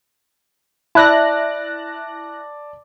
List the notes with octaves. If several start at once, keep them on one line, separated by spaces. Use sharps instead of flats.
E4 D5 A5 F#6 A#6